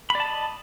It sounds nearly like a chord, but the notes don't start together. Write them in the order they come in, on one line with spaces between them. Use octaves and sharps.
B5 D5 A5 D#5